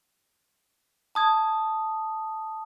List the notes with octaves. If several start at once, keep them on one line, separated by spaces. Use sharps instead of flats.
A5 D#6 G#6